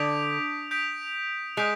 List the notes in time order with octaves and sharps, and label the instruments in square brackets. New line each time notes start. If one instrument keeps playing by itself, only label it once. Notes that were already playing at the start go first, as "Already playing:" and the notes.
Already playing: [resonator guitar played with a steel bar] D3 [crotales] D#6 G6 B6 D7 F7
[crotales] D#6 G6 B6 D7 F7
[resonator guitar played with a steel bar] G#3 [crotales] D#6 G6 B6 D7 F7